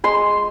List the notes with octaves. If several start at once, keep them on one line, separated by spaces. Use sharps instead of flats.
G#3 C6